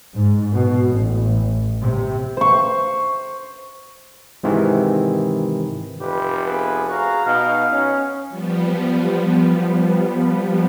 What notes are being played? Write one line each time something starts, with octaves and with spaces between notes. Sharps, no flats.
G#2
B2
A1
C3
C5 C#6
G#2 C3 D#3 E3
F1 C4 G4 B4
B3 G#4 B4 G#5
F#4 G#4 F5 A#5
B2 D#4 F5
C#4
F3 G3 B3